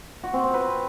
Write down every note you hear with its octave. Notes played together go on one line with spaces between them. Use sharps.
F#4
C4
C4
B4